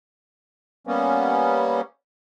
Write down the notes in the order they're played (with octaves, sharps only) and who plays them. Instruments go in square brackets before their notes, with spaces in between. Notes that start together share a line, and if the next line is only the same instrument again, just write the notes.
[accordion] G3 A#3 B3 C#4